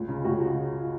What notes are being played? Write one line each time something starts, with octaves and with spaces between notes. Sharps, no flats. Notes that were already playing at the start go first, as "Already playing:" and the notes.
Already playing: C#2
C#3
C#2 F#4